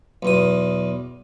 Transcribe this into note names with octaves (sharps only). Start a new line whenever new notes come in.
B1 E2 D#6